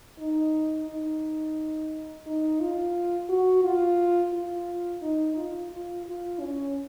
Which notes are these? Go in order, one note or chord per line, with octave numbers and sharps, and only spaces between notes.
D#4
D#4
D#4
F4
F#4
F4
F4
D#4
F4
F4
F4
C#4